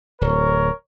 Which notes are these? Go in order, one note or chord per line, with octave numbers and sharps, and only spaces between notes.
D1 A#4 C#5